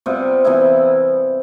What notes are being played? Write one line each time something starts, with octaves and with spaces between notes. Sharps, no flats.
C3 G3 B3 F4
C3 E3 B3 E4